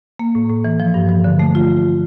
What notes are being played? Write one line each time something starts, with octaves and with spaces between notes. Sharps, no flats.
A#3
A2
A2
E3
F3
G2
F3
D3
A3
F4